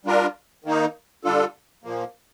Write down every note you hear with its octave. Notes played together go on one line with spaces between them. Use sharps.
G3 D4 F4 A#4
D#3 A#3 D#4
D3 G3 D4 F4 A4
A#2 F3 A#3